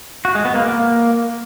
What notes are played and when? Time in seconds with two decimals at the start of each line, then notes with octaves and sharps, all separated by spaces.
0.25 F#4
0.35 G#3
0.45 B3
0.55 A#3
0.65 A#3